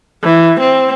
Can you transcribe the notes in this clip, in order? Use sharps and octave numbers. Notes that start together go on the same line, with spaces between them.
E3
C4